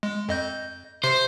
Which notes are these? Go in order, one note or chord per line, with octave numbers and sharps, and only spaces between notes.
G#3
F2 D#5 G6
C3 C5